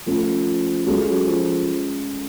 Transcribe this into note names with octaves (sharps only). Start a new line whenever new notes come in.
F3 A3 C#4 F4
F#3 G#3 C#4 F4 A4
F#3
F3